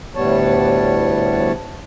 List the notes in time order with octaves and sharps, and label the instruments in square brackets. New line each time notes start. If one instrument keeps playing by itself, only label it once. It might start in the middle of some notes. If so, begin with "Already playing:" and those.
[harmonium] D2 A2 G3 B3 C#5 A5